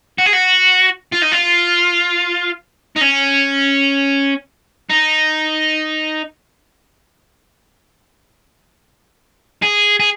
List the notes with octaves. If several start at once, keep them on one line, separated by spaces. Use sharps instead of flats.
F#4
G#4
F#4
F4
D#4
F4
D#4
C#4
D#4
G#4
G#4